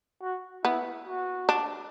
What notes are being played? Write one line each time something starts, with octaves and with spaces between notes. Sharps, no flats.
F#4
B3 E4
F#4
D4